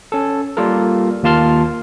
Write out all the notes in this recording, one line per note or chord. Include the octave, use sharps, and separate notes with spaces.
C#4 A4
G3 A#3 F4 A4 A#4
D#2 A#3 F4 A5 C6 F6